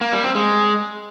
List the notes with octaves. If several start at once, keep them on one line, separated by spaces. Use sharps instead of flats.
A#3
G3
C4
G#3